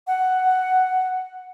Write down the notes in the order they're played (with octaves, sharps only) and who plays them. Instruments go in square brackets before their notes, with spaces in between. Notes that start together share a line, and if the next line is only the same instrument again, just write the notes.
[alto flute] F#5